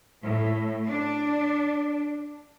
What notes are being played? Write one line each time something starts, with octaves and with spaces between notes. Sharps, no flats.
A2
D4